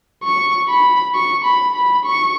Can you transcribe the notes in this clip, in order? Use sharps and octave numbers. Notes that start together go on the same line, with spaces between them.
C#6
B5
C#6
B5
B5
C#6